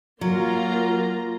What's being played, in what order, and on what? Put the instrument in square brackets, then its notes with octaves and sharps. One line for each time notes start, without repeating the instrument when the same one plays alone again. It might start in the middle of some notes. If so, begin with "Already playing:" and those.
[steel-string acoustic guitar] F#3 [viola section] A#3 F4 A#5